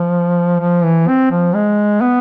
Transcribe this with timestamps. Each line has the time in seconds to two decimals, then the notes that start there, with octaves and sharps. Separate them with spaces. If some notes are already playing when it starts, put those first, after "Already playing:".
Already playing: F3
0.60 F3
0.84 E3
1.08 C4
1.31 F3
1.54 G#3
2.01 B3